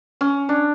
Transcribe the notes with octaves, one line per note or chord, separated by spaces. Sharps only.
C#4
D4